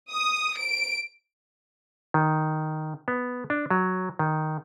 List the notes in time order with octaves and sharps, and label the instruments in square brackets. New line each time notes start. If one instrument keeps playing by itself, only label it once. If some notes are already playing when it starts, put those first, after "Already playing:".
[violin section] D#6
D7
[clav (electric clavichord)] D#3
B3
D4
F#3
D#3